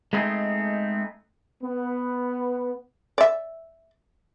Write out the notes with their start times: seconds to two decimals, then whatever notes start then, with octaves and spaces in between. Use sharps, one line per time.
0.13 G#3 A3 B3 C4 D#4 G#4
1.64 B3
3.18 D5 E5